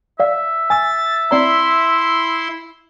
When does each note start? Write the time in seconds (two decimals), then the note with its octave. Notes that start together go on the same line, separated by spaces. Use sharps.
0.20 D5 E5 F5
0.70 G#5 E6 A6
1.31 C4 E4 D5 A#5 C6